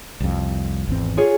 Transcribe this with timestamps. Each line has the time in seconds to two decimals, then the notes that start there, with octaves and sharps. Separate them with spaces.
0.20 C2 F2
0.87 G#1 E2 C4
1.17 F4 G#4 C#5